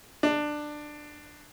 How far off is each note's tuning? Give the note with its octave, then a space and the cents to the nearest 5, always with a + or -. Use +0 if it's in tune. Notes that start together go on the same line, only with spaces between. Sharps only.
D4 +15